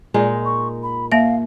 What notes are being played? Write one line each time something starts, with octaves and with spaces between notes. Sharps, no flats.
A#2 G#3 D#4
C#6
B5
A#3 E5 F5